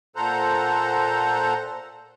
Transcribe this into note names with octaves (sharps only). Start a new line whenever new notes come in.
A#2 A4 C5 F#5 A#5